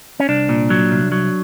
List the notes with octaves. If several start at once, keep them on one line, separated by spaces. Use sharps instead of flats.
C#4
C2 D4
A#2
F#3
C2
F#3